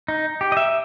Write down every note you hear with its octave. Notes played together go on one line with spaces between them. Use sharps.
D#4
G4
D#5
E5